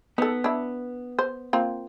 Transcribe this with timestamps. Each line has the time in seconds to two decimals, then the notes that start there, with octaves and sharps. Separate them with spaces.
0.18 B3 D#4 A4
0.44 D4 E4
1.19 C5
1.53 A#3 C4 F4